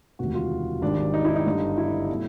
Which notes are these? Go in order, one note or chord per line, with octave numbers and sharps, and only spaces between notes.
E1 D2 C3 D#3 F#4
F4
G#1 G#2 D#3 G3 D4
D4
D#4
E4
D#4
G1 G2 D3 G3
E4
B2 F#3 A3